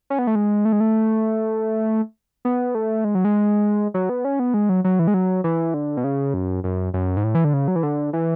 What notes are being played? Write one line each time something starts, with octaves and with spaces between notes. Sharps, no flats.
C#4
B3
A3
G#3
A3
G#3
A3
B3
A3
G#3
F#3
G#3
F#3
B3
C#4
B3
G#3
F#3
F#3
E3
G#3
F#3
E3
D3
B2
C#3
F#2
F#2
F#2
G#2
A2
E3
D3
C#3
F#3
E3
D3
E3